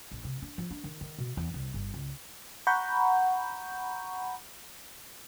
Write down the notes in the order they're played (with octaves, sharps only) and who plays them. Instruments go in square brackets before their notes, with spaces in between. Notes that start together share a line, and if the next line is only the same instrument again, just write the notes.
[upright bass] A#1
C3
D4
F3
D4
D#3
D#3
B2
E2
C2
G1
C#2
[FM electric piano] F#5 A#5 B5 C#6 G6